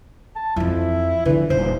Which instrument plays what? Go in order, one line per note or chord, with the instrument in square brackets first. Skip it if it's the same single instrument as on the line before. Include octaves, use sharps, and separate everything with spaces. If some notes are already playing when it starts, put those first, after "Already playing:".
[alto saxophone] A5
[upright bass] F2 E3 [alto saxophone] E4
[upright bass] D3 F3 [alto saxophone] E3
[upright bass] D#1 [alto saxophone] C5